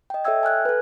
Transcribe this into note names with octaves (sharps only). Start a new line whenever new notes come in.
D#5 G5
A4 C#5 E5 G5 E6 G#6
G#5 F6 F#6 G#6
A4 B4